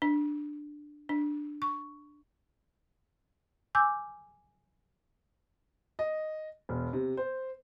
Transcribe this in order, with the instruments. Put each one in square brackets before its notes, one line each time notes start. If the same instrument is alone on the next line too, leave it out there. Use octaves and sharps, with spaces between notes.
[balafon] D4
D4
C#6
[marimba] G#5 D6 E6 G6
[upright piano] D#5
E1
C3
C5